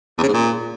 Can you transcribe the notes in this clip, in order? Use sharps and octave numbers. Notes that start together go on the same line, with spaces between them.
E2
C#3
G#2
A#2